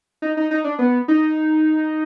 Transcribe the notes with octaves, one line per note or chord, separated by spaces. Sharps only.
D#4
D#4
D#4
D4
B3
D#4